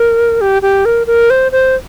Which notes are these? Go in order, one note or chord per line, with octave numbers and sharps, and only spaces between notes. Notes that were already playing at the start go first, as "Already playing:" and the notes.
Already playing: A#4
G4
G4
A#4
A#4
C5
C5